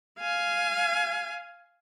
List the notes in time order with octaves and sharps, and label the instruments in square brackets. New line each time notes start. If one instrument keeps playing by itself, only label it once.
[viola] F5 G#5